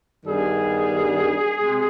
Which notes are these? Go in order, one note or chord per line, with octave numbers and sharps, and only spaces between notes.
G2 D#3 G3 B3 G#4
C3 G#3